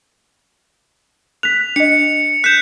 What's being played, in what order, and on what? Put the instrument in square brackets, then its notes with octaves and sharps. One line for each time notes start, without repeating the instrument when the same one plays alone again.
[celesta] F#6 B6 [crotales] F7
[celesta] D4 D#5 [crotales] C#7
[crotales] F#6 G6 [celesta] B6 E7